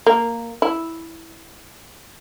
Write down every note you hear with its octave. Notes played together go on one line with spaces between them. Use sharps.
A#3
E4